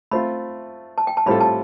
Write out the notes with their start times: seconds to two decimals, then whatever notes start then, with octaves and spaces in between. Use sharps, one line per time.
0.11 A3 C4 F4 B5
0.98 A5
1.07 G5
1.17 A5
1.26 A2 G3 C4 F4 A4 B5
1.41 A5